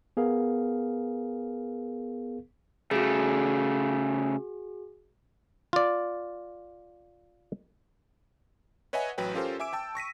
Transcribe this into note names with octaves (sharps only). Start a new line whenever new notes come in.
B3 G#4 A#4 F5
C#3 A3 F#4 G#4
F4 D5
B4 C#5 D#5 E5 F#5 G#5
A1 F#3 B4 G5
C#4 F4 G4 A4 A#4 C5
E5 G#5 D6 E6 D7
G5 A5 E6
C#6 A#6 B6 D#7